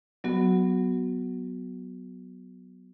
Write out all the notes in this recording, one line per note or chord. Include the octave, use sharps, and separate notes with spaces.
F#3 B3 F#4